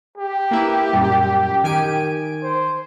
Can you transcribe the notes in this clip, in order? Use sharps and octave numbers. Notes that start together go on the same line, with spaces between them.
G4
A#3 E4 B4
F#2 A#2 G3
D#3 G#5 D7
C5